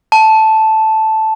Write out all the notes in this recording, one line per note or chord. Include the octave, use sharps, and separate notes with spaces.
A5